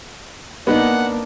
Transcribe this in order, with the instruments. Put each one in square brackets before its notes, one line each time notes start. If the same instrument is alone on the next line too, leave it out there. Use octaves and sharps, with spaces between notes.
[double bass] A#3 D4 [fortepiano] B3 D#4 [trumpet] F#5